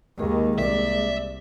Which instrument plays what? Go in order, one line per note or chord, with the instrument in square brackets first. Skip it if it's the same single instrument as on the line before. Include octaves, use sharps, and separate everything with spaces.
[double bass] D#2 D#3 [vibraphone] G#3 A#3 G#4
[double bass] C2 [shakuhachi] D5 [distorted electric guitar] E5